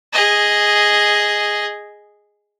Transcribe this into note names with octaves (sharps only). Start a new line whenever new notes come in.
G#4 D#5